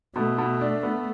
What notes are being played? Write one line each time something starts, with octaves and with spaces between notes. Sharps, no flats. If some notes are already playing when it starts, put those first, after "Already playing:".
B2 A3
B2
D4
B3